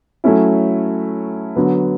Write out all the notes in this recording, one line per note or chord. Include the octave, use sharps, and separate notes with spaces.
F#3 A3 C#4 E4
D3 F#3 B3